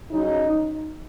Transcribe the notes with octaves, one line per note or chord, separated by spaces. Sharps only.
C#3 F#3 C#4 D#4